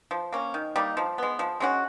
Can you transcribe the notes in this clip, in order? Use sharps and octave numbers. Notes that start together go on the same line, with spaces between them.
F3
A#3 C#4
D#3
G3 A#3 D#4
F3
G#3 B3
F3
G#3 C#4 F#4